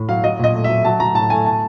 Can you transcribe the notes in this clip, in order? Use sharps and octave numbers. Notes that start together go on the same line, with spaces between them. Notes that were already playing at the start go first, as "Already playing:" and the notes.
Already playing: A2
F#3 F5
F#3 D#5
A#2 D#5
A3
F#3 E5
F#3 A5
F#3 A#5
A2 A5
A3 G#5
A5